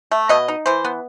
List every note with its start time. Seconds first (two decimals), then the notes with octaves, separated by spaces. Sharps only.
0.11 A3
0.29 B2 D#5
0.48 D#4
0.66 E3 C5
0.85 B3